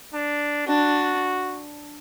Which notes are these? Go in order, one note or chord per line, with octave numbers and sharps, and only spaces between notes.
D4
D4 F#4